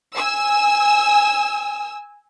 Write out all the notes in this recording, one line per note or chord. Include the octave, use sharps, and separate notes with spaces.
G#5 E6